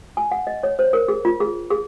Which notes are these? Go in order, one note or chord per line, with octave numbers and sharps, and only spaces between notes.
G#5
F#5
D#5
C#5
C5
A#4
G#4
F4
G#4
G#4